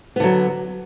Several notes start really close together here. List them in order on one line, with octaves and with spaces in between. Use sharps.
B3 D3 F#3